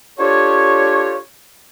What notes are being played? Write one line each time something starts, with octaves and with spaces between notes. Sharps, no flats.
D4 F4 G4 A4 C#5